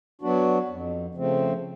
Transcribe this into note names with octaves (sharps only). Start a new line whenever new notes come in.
F#3 B3 D4 F#4
F2
C#3 F3 A3 C4